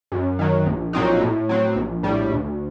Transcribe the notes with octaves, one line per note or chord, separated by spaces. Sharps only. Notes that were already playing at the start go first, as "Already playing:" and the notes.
F#2
D#3 F#3
A#1
A#2 F#3 C4 D#4
A2
F#3 C4
A#1
A2 G3
D2